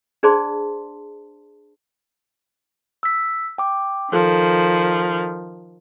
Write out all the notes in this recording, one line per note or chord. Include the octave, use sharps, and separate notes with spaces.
D4 G#4 C5 D5 A5 C6
E6 B6
G5 D6
D#3 F3 A4